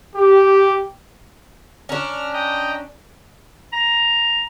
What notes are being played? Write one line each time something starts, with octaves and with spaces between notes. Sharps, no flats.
G4
C#4 D4 A#5 F6
D#5 G5 A#5
A#5